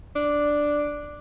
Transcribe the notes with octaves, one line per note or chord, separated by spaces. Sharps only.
D4